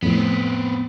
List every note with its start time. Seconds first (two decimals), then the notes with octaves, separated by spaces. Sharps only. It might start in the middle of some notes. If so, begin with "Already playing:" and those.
0.03 F2 A2 B3 C4